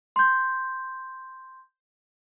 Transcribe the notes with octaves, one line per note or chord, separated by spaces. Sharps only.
C6 G6